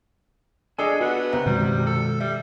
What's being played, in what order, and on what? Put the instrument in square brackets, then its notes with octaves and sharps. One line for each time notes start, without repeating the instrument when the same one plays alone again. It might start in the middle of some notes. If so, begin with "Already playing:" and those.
[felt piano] D4 D5 [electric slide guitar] G#4 D#5 G#5 [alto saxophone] A4
[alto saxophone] B3 [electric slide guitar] F#4
[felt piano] F#1 C3 A#5
[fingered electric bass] B2 D#3 G#3 [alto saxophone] G3
[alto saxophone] A4
[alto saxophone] G3 [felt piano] E5